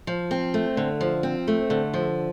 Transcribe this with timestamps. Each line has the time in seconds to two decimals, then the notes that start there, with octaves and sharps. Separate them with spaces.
0.07 F3
0.31 C4
0.54 A3
0.77 D3
1.01 F3
1.23 C4
1.47 A3
1.70 D3
1.94 F3